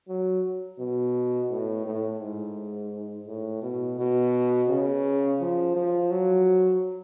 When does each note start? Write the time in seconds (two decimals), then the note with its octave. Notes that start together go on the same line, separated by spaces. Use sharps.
0.08 F#3
0.79 B2
1.50 A2
1.86 A2
2.21 G#2
3.27 A2
3.62 B2
3.99 B2
4.69 C#3
5.40 F3
5.76 F3
6.11 F#3